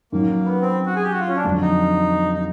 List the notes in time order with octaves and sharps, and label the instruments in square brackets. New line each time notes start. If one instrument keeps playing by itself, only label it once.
[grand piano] F#2 D#3 F#3 [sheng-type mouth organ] A#3
[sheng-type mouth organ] B3
C4
F#4
G#4
G4
F#4
F4
C#4
D4
[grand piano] F2 D3 F#3
[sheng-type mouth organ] D#4
D#4